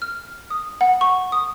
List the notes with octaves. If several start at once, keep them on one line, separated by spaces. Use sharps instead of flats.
F6
D#6
F#5
C#6
D#6